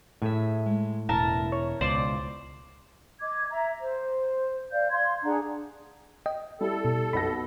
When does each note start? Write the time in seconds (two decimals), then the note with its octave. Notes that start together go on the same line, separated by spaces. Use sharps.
0.22 A2 G#4 E5
0.66 G#3
1.09 E1 E4 A#4 A5
1.52 C#5
1.81 C#2 B2 C5 D5
3.20 D#5 D6 G#6
3.49 E5 A#5
3.81 C5
4.71 D5 F5 G6
4.90 F5 C6 G#6
5.24 D4 G#4 F#5 A#5
6.26 D#5 G5
6.61 G3 E4 A4
6.85 B2
7.13 B1 B2 B5 A#6